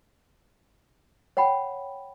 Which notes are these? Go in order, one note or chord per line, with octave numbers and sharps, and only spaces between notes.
C#5 F#5 G5 B5